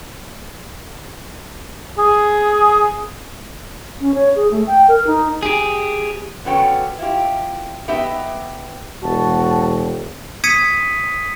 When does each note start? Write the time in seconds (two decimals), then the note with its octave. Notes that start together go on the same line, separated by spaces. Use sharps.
1.98 G#4
4.01 C#4
4.14 C#5
4.35 G#4
4.51 A3
4.67 G5
4.88 A#4
5.07 D#4
5.43 G4 G#4
6.45 D3 F#3 B3 C#4 G5
6.98 E4 F4 G4
7.88 B3 D#4 G4 E5
9.03 E1 F#4 A5
10.44 D#6 G#6 B6 C#7 D#7